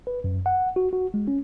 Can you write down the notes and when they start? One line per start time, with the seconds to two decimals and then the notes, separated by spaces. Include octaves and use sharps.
0.07 B4
0.24 F#2
0.46 F#5
0.76 F#4
0.93 F#4
1.14 G#3
1.28 C#4